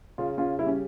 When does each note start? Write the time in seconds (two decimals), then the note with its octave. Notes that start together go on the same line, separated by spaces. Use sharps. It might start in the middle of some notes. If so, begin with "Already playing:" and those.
0.18 C#3 F4
0.38 C#4 F4
0.59 G3 E4
0.67 C#4